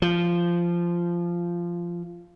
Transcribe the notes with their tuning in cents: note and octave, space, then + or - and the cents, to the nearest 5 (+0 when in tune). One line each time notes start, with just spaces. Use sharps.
F3 -15